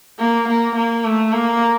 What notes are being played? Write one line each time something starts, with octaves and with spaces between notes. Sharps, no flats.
A#3
A#3
A#3
A3
A#3